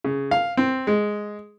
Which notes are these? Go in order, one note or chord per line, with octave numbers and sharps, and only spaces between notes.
C#3
F5
C4
G#3